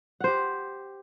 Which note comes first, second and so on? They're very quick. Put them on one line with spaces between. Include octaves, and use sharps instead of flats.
F#5 C5 G4